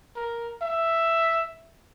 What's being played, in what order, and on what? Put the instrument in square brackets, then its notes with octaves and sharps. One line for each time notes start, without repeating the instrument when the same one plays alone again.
[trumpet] A#4
E5